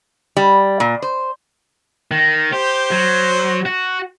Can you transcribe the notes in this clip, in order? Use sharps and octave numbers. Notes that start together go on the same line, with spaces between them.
G3
A#2
C5
D#3
G4 C5
F#3
F#4